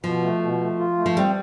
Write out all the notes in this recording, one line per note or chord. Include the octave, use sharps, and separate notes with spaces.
B2 F3
A3
B2
A3
F4
A3
F3
G3 C4